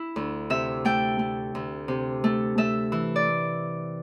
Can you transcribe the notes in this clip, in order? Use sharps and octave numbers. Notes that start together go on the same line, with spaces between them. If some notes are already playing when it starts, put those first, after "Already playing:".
Already playing: E4
D2
C3 E5
A3 G5
A3
D2
C3
A3
A3 E5
E3
D5